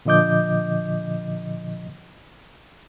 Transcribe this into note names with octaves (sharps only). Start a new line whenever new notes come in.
A#2 D3 F3 D#5 D6 G6